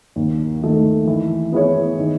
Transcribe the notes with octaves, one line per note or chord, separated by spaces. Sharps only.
D#2
D#3 A3
E3
B3 E4 G#4 C#5
D#3